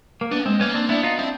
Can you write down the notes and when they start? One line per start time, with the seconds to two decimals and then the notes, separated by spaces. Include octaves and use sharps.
0.21 A#3
0.31 B3 D4
0.45 G#3 C4
0.60 A#3 B3 C#4
0.74 C4 D4
0.89 B3 D4 E4
1.03 D#4 F4
1.18 C4 D4 E4